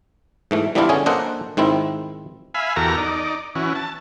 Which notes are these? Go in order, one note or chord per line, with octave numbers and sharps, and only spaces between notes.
G#2 E3 A3
E3 G3 B3 D4 E4 F4
D3 C#4 G#4
A#3 D4 A4 C5 D#5 F#5
G#2 D#3 C4 E4
E5 F5 G#5 B5
E2 F#4 G4 A4 A#4 A#5
D#4 D5
E3 C#4 F#4
A5